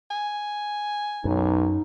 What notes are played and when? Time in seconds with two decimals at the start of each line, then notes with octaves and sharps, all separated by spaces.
0.11 G#5
1.25 B1 F#2 D#4